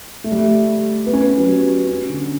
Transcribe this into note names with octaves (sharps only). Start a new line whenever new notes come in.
A3
G3
A3
B3
C#4
B3
F#3
G3
C#4
D3